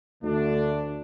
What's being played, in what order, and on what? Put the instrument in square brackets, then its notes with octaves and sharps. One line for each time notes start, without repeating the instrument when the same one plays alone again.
[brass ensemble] D2 D3 A3 D4